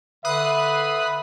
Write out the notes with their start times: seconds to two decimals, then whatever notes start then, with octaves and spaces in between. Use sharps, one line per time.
0.25 D3 B4 E5 D#6 F#6 C7